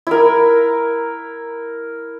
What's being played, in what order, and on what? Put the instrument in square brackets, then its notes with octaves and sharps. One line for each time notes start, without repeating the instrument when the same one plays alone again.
[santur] E4 A#4